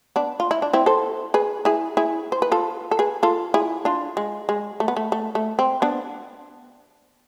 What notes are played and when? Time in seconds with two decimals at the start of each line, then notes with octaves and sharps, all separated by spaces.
0.16 B3 D4
0.40 F4
0.51 E4
0.62 D4
0.73 C4 E4
0.86 A4 C5
1.34 G#4 B4
1.65 E4 G#4
1.97 E4 G#4
2.32 C5
2.42 B4
2.52 F4 A4
2.91 A4
2.99 G#4 B4
3.23 F4 A4
3.54 E4 G#4
3.85 D4 F4
4.17 G#3
4.49 G#3
4.80 A3
4.88 B3
4.97 A3
5.12 A3
5.35 A3
5.59 C4
5.82 B3 D4